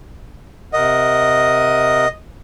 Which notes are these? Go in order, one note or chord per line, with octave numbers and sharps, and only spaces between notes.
C3 A#4 D#5 F#5